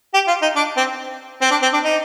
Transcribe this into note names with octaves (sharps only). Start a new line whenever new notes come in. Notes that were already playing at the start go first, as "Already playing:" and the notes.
G4
F4
D#4
D4
C4
C4
D4
C4
D4
D#4